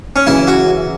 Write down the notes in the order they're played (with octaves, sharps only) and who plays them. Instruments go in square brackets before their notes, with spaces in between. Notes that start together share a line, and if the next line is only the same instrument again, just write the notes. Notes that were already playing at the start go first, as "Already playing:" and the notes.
[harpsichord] C#4
[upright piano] F#2 C#3 E3 [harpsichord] E4
[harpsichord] F#4